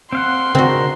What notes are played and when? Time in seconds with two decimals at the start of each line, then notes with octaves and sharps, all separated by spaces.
0.13 C4 F5 F#5 C6
0.55 C#3 C4 D4 D#4 F#4 A#4